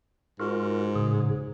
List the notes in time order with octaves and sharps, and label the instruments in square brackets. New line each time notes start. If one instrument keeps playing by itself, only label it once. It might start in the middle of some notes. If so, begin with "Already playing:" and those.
[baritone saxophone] G#2 [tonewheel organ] F4 F#4 A#4
[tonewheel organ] A2 C#3 G#4